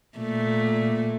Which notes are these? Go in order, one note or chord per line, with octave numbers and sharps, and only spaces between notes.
A#2 A3